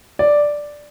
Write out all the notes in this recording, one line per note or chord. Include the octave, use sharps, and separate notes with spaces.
D5